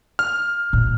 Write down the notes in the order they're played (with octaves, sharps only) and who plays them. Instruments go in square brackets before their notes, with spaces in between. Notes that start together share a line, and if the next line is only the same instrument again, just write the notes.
[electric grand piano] F6
[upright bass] A#2